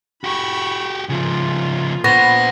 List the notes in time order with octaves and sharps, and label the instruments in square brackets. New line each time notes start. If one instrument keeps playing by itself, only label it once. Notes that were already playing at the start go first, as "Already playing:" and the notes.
[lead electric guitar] F#4 G4 [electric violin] B5 C#6
[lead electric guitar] C#3 F3 [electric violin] A#3 F4
[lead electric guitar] A#2 C5 [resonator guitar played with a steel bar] B3 [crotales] C#6 A#6